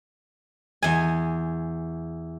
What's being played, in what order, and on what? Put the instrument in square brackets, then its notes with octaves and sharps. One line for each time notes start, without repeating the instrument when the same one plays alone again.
[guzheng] E2 G#5